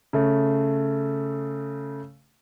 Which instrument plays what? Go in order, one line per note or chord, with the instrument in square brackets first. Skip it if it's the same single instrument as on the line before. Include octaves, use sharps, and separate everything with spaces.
[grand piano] C#3 A3